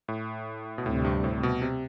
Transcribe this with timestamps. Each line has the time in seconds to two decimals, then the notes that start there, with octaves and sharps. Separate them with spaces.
0.08 A2
0.78 B2
0.85 D2 A2 C3 G3 C4
1.05 G2
1.24 A2
1.43 B2
1.62 C3